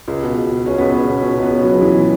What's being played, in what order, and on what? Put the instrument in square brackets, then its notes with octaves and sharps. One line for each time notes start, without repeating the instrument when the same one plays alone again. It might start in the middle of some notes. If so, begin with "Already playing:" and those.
[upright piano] C#2
B2
C#2
B2
C#2 C#4
C#2 B3
C#2 C#4
B2
B2 C#4
C#2 B3
B2
C#2 F#3
C#2 E3
B2